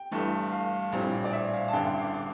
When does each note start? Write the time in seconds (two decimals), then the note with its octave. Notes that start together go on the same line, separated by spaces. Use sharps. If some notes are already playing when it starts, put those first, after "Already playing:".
Already playing: G5
0.11 G1 G2 E3 A3
0.52 F5
0.92 A#1 A2 G3 C4
1.24 D5
1.33 E5
1.54 F5
1.68 A5
1.73 A1 G2 D3 G5
1.87 C6
2.00 D6
2.14 D6